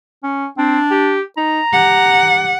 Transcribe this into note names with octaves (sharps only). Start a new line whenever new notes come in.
C#4
C4 D4
G4
D#4 A#5
G4 F#5